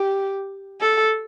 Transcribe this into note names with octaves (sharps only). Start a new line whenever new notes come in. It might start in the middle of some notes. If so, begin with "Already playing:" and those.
Already playing: G4
A4